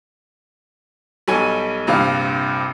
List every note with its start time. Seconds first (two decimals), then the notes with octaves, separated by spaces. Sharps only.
1.28 B1 G3 A4 C#5 G#5 D#7
1.87 A#1 G2 C3 F5